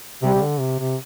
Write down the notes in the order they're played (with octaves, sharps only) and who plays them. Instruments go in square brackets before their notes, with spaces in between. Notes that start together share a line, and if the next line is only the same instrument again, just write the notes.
[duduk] C3 [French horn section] G3
[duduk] C3
D3
C3
C3